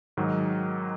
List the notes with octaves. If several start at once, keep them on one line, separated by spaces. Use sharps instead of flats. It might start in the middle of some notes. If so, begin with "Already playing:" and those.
G#2 D#3 F#3